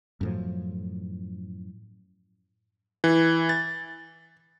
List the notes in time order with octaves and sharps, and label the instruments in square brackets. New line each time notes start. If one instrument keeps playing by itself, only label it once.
[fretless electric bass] F#2 A2 F3
[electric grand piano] E3
A6